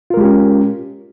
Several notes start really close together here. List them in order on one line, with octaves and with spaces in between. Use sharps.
F4 A#4 G#3 G4 C#4